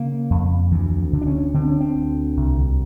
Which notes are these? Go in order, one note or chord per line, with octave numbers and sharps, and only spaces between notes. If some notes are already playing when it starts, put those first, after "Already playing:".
Already playing: C#3 A#3
F2
D2 E3
D3
D4
C#4
D3 C4
C#4
C4
D2
C2